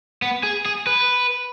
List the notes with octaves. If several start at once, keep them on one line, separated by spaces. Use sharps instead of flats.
B3
G#4
G#4
B4